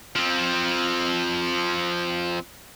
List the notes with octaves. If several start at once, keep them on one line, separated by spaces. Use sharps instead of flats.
F3 C4